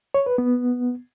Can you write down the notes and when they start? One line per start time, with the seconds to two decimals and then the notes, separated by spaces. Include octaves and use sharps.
0.14 C#5
0.26 B4
0.38 B3